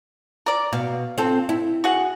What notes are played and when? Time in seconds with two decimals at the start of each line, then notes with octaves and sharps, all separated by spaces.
0.46 A#4 D5
0.73 B2 F5
1.18 C4 F4 A4
1.49 E4
1.84 F#4 G#4 F#5